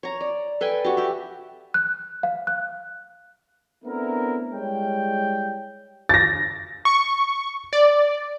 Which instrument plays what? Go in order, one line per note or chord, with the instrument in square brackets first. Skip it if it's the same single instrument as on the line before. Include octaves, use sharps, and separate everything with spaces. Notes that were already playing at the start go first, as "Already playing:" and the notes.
[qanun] C#5 A#5
D5
A4 B4 G5 G#5
F#4 G4
G4 E5
[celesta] F#6
F5
F#6
[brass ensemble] A3 B3 C4 D4 E4 A#4
G3 G#3 E4 C#5 G5
[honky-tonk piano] A6 A#6
[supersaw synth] C#6
D5